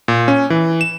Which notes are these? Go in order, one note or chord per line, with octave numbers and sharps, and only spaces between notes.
A#2
C#4
E3
E7